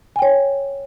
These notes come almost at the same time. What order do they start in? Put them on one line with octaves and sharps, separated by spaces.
G#5 G5 C#5